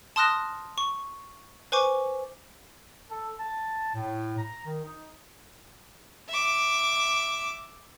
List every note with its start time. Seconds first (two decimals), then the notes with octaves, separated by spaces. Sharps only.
0.16 A5 C6 D#6 F6 F#6 A#6
0.78 C#6
1.72 B4 C5 G#5 C#6 D6
3.10 A4
3.39 A5
3.95 A2
4.38 A#5
4.65 D#3
4.85 D#4
6.29 E5 D6